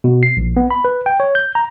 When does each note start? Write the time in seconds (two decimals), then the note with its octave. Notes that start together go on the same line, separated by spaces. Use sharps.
0.04 B2
0.23 C7
0.37 A#1
0.57 B3
0.71 B5
0.85 B4
1.06 G5
1.20 C#5
1.35 G6
1.55 A#5